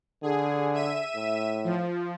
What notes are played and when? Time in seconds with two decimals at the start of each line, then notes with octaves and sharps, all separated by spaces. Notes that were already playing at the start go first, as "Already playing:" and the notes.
0.23 D3 G#4
0.74 E5 D#7 E7
1.15 A2
1.64 F3